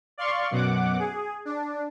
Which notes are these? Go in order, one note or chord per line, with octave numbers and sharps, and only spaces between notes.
D5 F5 C6 C#6
F#2 B2 F#5 D6
G#4
D4